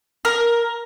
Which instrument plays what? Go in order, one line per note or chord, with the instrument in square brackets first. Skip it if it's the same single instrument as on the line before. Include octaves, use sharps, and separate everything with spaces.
[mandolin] A#4